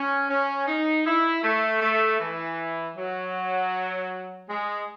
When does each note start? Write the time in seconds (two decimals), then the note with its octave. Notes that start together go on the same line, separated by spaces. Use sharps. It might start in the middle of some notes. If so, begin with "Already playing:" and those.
Already playing: C#4
0.29 C#4
0.67 D#4
1.06 E4
1.43 A3
1.82 A3
2.20 E3
2.96 F#3
4.49 G#3